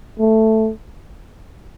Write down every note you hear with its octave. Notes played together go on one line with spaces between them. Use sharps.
A3